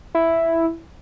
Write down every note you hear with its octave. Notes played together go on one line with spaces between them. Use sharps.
E4